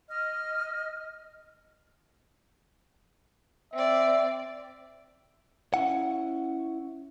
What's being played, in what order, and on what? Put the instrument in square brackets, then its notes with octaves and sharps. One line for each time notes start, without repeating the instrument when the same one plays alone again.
[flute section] D#5 F6
[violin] C4 D5 [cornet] E5
[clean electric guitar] C#4 E4 F#5